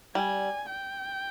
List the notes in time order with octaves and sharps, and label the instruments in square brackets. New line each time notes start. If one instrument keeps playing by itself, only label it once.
[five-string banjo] G3 [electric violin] G#5
[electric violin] G5